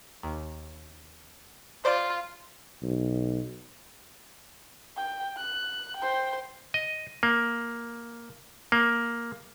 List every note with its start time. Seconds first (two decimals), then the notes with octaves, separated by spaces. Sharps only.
0.23 D#2
1.85 F4 C5 D5 D7
2.83 B1
4.97 G5
5.37 F#6
5.98 C5 G5
6.74 D#5
7.23 A#3
8.72 A#3